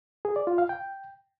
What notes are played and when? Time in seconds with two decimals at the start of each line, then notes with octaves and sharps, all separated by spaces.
0.25 G#4
0.36 D5
0.47 F4
0.58 F5
0.69 G5